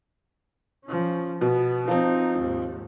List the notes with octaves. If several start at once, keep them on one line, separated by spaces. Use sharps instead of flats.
F3 C#4
B2 B3
F3 C4 D#4
D#2 G#2